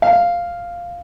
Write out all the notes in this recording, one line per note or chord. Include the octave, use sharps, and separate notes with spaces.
F5